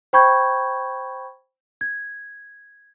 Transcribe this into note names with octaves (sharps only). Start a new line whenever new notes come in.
C5 G5 B5 C#6 G6 G#6
G#6